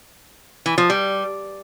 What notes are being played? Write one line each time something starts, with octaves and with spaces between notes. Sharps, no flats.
E3
F3
G3